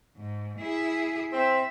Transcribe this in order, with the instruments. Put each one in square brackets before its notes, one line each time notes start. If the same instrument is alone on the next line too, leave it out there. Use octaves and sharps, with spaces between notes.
[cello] G#2
E4 G#4
[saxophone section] C4 [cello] E5